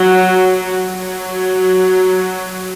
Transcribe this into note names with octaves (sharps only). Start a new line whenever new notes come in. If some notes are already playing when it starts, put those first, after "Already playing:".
Already playing: F#3
F#3